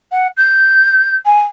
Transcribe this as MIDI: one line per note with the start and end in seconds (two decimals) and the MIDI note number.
0.11 0.27 78
0.37 1.14 91
1.25 1.41 80